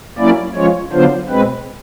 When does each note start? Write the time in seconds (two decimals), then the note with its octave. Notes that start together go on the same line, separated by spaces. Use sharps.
0.18 F#3 A#3 C#4 E4 D5
0.55 F3 G#3 C#4 F4 C#5
0.92 D3 F#3 B3 D4 F4 C5
1.30 B2 G#3 C4 B4